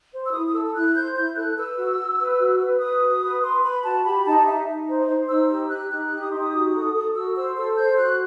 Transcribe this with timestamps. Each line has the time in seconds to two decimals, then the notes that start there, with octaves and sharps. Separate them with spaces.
0.13 C5
0.26 E6
0.33 E4 D#6
0.47 D#6
0.53 A4 E6
0.65 E6
0.74 E4 F#6
0.94 C5 G6
1.15 E4 G6
1.36 A4 F#6
1.56 B4 E6
1.77 F#4
1.98 F#4
2.19 B4
2.39 F#4
2.60 B4
2.80 B4 D#6
3.02 F#4
3.21 B4
3.43 B4 C6
3.63 B4 B5
3.84 F#4 A5
4.04 G4 B5
4.25 D#4 A5
4.46 D#4 E5
4.67 D#4
4.88 C5
5.08 C5
5.29 D#4 E6
5.49 G4 E6
5.69 D#4 F#6
5.90 D#4 F#6
6.12 G4
6.22 D#6
6.30 D#4 C6
6.40 D#6
6.53 F#4
6.74 A4
6.94 A4
7.14 F#4 E6
7.35 C5 E6
7.56 A4 E6
7.77 C5 G6
7.97 F#4 F#6